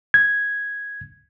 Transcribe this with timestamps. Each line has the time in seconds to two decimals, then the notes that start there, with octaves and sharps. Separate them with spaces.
0.14 G#6